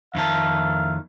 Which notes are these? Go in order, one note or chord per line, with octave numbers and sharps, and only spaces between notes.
F2 D#3 A#4 E5 F5 A5